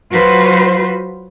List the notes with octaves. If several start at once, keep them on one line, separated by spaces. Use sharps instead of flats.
F#3 F4 F#4 B4 C5